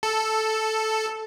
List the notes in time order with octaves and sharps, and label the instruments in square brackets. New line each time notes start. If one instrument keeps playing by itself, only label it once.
[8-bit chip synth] A4